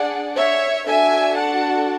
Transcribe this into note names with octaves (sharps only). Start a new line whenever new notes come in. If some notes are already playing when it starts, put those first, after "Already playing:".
Already playing: D4 G#4 D5 F#5
C#5 E5
D4 F#4 A4 E5 G#5
F#5 A5